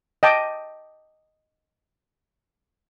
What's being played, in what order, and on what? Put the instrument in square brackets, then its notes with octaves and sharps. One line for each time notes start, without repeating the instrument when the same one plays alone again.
[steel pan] D#5 G5 A5 D6